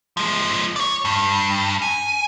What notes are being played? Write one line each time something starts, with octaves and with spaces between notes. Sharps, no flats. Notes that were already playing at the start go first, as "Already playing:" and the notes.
F3 G#3
C#5 D5
G2
G#5